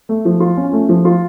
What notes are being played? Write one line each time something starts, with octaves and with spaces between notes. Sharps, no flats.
A3
F3
F4
C#4
A3
F3
F4